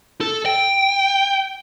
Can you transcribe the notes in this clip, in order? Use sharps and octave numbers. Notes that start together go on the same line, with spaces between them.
A4
G5